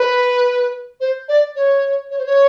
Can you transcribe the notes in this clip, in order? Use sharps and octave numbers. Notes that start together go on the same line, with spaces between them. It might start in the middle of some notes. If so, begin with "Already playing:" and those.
Already playing: B4
C5
D5
C#5
C#5
C5
C#5